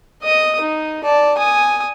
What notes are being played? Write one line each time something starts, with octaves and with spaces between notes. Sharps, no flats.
D#5 D#6
D#4
D5 A5
G#5 D#6